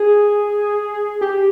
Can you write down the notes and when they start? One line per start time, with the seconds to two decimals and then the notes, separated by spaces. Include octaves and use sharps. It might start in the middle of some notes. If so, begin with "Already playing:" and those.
Already playing: G#4
1.21 G4